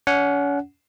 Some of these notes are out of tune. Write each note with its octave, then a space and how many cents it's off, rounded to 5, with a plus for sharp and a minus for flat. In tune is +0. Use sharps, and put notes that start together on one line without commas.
C#4 +40 F#5 +0